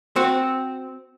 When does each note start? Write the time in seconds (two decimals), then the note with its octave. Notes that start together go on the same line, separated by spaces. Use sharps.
0.16 C4 F#4